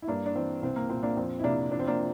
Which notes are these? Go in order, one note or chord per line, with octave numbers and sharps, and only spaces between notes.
E4
G2 A#3 D4
D4
E3 C4
C2 C4
A#3
A#2 C4
A#3 D4
F2 C4
E4
C3 A#3 D4
F3 D4
C4
A#3 D4